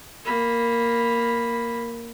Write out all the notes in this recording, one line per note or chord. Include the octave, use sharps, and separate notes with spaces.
A#3 B5